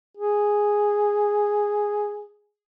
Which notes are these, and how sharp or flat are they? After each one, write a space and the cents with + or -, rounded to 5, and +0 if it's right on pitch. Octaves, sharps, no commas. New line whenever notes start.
G#4 -5